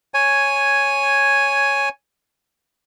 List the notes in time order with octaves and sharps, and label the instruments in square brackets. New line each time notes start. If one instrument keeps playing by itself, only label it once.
[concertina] C#5 G#5